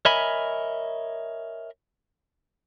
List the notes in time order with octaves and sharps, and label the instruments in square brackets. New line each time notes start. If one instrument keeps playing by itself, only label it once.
[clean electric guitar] A#4 C#5 D#5 E5 G#5 B5